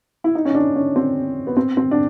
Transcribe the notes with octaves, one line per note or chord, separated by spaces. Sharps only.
E4
D#4
C#4
D4
C#4
C4
B3
C4
C4
D4